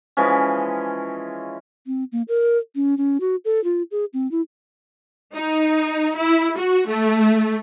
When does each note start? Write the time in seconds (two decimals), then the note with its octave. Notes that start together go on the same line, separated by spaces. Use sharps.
0.17 E3 F3 G#3 C#4
1.87 C4
2.12 A#3
2.28 A#4
2.75 C#4
2.98 C#4
3.21 F#4
3.45 A4
3.64 F4
3.91 G#4
4.13 C4
4.31 E4
5.34 D#4
6.16 E4
6.57 F#4
6.87 A3